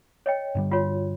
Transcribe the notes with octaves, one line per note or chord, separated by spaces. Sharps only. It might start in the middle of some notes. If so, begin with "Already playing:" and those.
C#5 D#5 G5
G2 D3 G3
F4 F#4 C#5